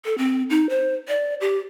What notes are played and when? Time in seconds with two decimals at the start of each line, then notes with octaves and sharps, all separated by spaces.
0.05 A4
0.18 C4
0.50 D#4
0.69 C5
1.08 D5
1.41 G4